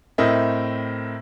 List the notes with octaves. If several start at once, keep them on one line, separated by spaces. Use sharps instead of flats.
A2 C4 A#4 D#5 E5